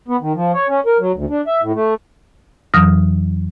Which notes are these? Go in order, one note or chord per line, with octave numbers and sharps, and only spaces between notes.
B3
D#3
F3
C#5
C#4
A#4
F#3
D2
D4
E5
A2
A3
F2 E3 F#3 D#6 F6 A#6